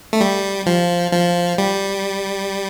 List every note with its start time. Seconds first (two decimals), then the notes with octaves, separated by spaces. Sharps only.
0.13 A3
0.21 G3
0.66 F3
1.13 F3
1.58 G3